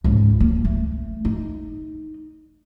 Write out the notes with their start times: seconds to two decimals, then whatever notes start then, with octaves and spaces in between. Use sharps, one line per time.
0.04 C#2 G#2
0.40 A#3
0.65 A3
1.25 D#4